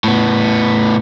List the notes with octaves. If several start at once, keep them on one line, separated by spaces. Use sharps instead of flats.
A2 B3